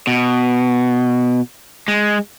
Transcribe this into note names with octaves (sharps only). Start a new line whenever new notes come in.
B2
G#3